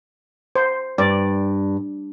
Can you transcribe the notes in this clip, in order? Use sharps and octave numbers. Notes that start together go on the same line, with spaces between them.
C5
G2 D5